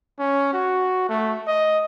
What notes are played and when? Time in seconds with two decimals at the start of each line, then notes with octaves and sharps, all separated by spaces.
0.19 C#4
0.53 F#4
1.09 A3
1.47 D#5